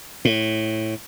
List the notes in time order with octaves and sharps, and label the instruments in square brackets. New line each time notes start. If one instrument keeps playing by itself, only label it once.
[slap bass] A2